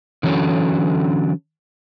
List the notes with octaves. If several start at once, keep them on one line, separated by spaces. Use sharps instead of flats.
D3 E3 F#3 C#4 A4